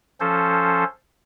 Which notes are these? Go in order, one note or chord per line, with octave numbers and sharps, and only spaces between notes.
F3 C#4 A4 C5